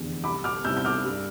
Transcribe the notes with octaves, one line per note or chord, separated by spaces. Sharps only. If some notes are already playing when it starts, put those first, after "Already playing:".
Already playing: F1 E2 D3
C2 B5 D6
D6 F6
C3 G3 C4 E4 E6 G6
G6
D6 F6
G2